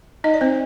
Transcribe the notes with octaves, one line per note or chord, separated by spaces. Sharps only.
D#4 D#5
D5
C4 C5